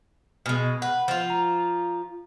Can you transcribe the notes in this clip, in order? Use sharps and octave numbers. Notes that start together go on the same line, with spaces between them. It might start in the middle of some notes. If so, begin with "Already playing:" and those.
B2 G#3 F6
B4 F#5
F3 F4
A#5